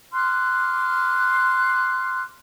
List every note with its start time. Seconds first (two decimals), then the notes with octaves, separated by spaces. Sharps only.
0.13 C6 D6 F6 F#6